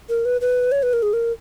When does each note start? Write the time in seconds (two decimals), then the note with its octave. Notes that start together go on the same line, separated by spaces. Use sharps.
0.09 A#4
0.25 B4
0.41 B4
0.72 C#5
0.83 B4
0.93 A#4
1.03 G#4
1.13 A#4